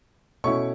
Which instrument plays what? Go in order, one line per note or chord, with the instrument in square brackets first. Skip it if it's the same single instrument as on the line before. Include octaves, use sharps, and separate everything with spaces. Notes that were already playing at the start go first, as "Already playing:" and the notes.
[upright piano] B2 A3 C#4 E4 C#6